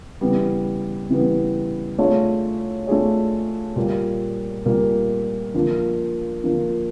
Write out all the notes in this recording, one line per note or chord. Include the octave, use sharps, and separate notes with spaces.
C#3 E3 G3 B3
C#3 E3 G3 B3
A3 D4 F4 G#4 C#5
A3 D4 F4 G#4 C#5
A#2 G3 A#3
A#2 G3 A#3
D3 F3 A#3
D3 F3 A#3